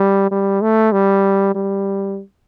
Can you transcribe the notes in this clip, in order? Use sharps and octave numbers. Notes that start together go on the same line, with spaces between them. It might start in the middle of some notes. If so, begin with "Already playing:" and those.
Already playing: G3
G3
A3
G3
G3